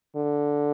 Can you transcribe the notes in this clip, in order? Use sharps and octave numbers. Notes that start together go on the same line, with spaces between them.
D3